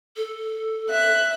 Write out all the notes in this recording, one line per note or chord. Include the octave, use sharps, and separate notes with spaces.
A4
E5 F#6